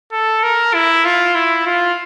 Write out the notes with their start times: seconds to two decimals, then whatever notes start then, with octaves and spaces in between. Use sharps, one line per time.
0.12 A4
0.43 A#4
0.74 E4
1.05 F4
1.35 E4
1.66 F4